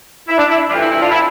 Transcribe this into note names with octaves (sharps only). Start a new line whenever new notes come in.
E4
D4
E4
G2 E3 A3 C4 D4 F4
E4
E4
D4 F4
E4